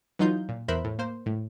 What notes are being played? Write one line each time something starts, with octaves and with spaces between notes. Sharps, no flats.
E3 F#3 D#4 F4 G6
A#2
E2 A#4 C5 E5 B5 F#6
A2
A#3 C5
A2